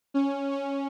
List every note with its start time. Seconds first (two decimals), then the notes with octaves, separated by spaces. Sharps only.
0.14 C#4
0.51 C#4